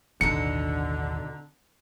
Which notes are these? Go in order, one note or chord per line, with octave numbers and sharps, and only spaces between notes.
A1 D#2 B2 D3 D#4 A4 C#7